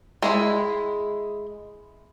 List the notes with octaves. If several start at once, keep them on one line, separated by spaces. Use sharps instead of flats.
G#3 E4 G#4